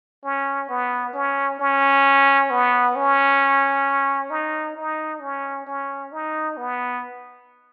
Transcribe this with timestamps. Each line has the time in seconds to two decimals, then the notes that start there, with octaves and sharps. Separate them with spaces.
0.24 C#4
0.69 B3
1.13 C#4
1.59 C#4
2.50 B3
2.96 C#4
4.30 D#4
4.77 D#4
5.21 C#4
5.67 C#4
6.12 D#4
6.57 B3